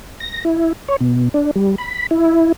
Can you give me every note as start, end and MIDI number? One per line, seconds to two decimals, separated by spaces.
0.20 0.44 94
0.45 0.73 64
0.88 0.96 73
1.01 1.29 47
1.34 1.51 62
1.56 1.75 55
1.78 2.06 83
2.11 2.52 64